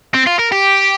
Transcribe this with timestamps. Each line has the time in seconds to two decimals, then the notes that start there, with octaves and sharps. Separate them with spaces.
0.14 C4
0.27 F4
0.39 A#4
0.52 G4